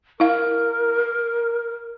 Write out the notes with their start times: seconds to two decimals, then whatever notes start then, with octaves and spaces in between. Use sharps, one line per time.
0.20 E4 A#4 F5